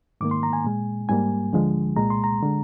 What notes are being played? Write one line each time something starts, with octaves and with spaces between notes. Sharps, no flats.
G#2 D#3 A#3 D6
C6
A#5
G#5
A#2 G#3
G#2 G3 A#3 G#5
D2 D3 F3 G#3
C2 A#2 G#3 A#5
C6
A#5
D3 G#3